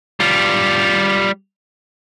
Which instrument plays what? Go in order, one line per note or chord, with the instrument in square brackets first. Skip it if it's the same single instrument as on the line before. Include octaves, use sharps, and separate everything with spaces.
[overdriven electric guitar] G3 F4